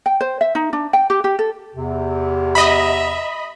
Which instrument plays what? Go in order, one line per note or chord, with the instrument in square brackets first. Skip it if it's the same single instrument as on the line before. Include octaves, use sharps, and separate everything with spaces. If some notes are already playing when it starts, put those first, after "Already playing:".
[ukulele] G5
C5
E5
D#4
D4
G5
G4
G4
A4
[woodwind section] E2 C3
[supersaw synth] D#5 B5 [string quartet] E5 A#5